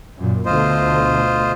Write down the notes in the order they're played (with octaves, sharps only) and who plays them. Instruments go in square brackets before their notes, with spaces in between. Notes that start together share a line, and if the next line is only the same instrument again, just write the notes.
[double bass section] F#2 A#2
[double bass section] D2 B2 A3 [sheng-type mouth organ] F4 C5 D#5